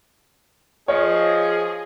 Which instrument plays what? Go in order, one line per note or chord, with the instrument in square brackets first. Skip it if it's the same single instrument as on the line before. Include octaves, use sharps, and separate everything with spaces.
[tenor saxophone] F3 [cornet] G#4 [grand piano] C#5 [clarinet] D#5